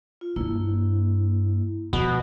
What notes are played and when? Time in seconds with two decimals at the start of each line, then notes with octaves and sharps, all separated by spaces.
0.21 F4
0.36 G2 A#3 D4 E4
1.93 B2 F3